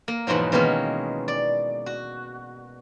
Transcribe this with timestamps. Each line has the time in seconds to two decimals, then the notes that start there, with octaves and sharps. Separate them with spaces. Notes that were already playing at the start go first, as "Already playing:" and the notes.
0.08 A#3
0.27 E2 G#2 B2 F3 F#3
0.52 B2 D#3 E3 G#3 A#3 C#4
1.28 D5
1.86 F#4